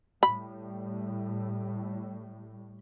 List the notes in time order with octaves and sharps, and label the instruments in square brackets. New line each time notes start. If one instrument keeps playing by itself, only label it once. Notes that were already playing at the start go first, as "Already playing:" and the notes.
[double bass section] A2 G3 [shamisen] B5